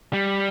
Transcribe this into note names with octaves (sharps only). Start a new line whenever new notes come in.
G3